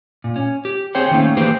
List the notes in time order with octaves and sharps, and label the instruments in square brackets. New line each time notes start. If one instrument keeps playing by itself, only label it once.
[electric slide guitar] A#2
C#4
G4
C4 G#4 C5 C#5 G5
D#3 A3 A#3 C#4 D#4
E3 A#3 G4 G#4 B4 C5